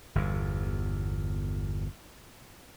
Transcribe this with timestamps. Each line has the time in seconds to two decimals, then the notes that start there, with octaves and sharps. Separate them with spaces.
0.15 G1 E2